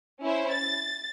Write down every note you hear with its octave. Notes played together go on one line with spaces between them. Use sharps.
C#4 E4 C5
A6